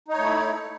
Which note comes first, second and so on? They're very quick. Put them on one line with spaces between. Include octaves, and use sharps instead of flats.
D#4 C#5 A3 E4